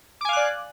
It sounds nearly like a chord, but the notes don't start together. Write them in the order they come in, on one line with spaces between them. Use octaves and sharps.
D6 G#5 F5 F#6 D5